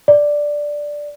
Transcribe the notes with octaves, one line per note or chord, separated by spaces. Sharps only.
D5